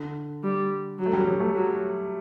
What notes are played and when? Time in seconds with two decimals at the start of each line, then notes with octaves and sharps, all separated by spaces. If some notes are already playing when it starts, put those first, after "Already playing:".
Already playing: D3
0.44 G3
0.99 F#3
1.06 A3
1.13 G3
1.27 F#3
1.40 A3
1.55 F#3